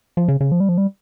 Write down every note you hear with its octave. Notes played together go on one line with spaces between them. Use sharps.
F3
C#3
C#3
F3
G3
F3
G3